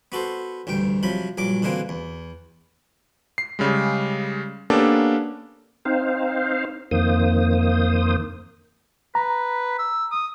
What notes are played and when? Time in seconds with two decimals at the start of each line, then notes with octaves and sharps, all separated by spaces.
0.12 B3 F#4 A4 C5
0.67 A1 D2 G2 G5
1.03 C3 F3 F#3 B5
1.38 A#1 G2 F#3 D6
1.62 B2 D3 E3 A#3 C4
1.89 E2
3.38 C7
3.59 C#3 G3 G#3
4.70 A#3 B3 C#4 D4 G4 A4
5.85 C4 D#4 C5 F5
6.91 F2 D#3 A#3 C5 D#6
9.15 B4 A#5
9.78 E6
10.11 D#6